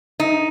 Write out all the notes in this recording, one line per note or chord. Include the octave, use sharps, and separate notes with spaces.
D#4